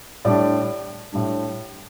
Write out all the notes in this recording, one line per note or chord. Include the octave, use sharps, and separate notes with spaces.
A2 G3 D4 D5
A2 G3 D4